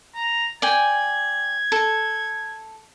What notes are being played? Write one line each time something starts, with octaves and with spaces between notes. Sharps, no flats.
A#5
D5 G5 G#5 G#6
A4